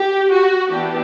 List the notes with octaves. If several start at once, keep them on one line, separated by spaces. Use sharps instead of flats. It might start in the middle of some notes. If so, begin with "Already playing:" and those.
Already playing: G4
F#4
E3 B3 D4 G4